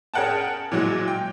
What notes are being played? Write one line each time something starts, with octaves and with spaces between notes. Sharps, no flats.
C#4 G#4 A#4 F#5 G5 A5
A#2 E3 F#3 G#3 F#4
G5